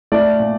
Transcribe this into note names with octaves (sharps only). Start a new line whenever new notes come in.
A3 D5
A#2